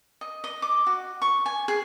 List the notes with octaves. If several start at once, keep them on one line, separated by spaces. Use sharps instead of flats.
D#5
D#5
D6
F#4
C#6
G#5
G#4